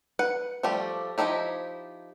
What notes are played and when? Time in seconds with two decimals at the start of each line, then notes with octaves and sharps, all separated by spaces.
0.19 B4 F#5
0.63 F3 G3 A3 G4
1.18 F3 F#3 D#4 E4 G4